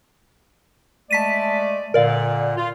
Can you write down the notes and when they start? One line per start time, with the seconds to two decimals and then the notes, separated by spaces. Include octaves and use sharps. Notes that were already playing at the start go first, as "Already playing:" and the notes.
1.11 G#3 A3 D5 A5 B6 D#7
1.94 A#2 D3 A#4 D5 F5
2.57 F4